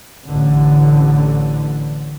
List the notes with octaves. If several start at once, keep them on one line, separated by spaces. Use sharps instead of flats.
A1 D3